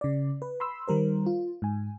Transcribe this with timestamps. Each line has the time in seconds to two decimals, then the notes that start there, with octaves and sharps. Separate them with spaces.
0.01 C#3 D5
0.42 B4
0.60 B5 C6 E6
0.88 D#3 G3 A#4 C5
1.26 F4
1.62 G#2 G#5